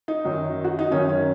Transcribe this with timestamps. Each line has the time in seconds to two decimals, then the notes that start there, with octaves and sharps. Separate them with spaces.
0.08 D#4
0.25 F#2 D#3 F#3
0.64 F#4
0.79 D#4
0.91 F#2 D#3 F#3 C#4
1.09 C#4